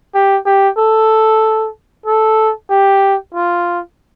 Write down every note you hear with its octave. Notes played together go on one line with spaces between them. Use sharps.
G4
G4
A4
A4
G4
F4